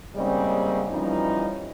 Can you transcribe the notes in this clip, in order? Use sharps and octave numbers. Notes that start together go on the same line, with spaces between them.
G#2 C#3 G3 A#3 C4 D#5
E3 F3 G3 C#4 D#4